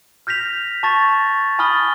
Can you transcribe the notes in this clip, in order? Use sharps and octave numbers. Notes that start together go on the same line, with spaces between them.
F6 G6 A#6 B6 F7
A5 C#6 A6 A#6
G#5 B5 D#6 F6 A6 G7